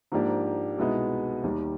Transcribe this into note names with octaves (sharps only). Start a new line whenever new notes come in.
G#2 F3 A#3 D4 G4
C2 B2 G#3 B3 D#4
D#2 D#3 G3